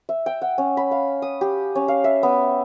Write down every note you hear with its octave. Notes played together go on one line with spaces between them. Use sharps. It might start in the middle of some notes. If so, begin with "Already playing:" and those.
E5
G5
F#5
C#4
B5
F5
D#6
G4
C#4
F5
E5
B3